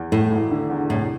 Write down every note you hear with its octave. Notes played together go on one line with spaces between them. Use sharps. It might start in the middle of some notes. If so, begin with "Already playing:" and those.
Already playing: E2
A2 A3
E1
D3
E2
C2 A2